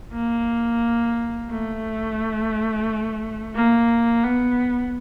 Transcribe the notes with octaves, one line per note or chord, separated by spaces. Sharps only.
A#3
A3
A#3
B3